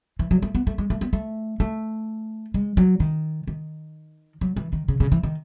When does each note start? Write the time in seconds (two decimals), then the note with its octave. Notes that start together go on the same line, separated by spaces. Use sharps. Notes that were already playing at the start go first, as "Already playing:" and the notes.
0.19 E3
0.31 F#3
0.42 A3
0.55 B3
0.67 A3
0.78 G#3
0.90 A3
1.01 B3
1.13 A3
1.60 A3
2.54 G#3
2.77 F#3
3.00 D#3
3.47 D#3
4.41 F#3
4.56 E3
4.73 D#3
4.88 C#3
5.00 C#3
5.12 E3
5.23 D#3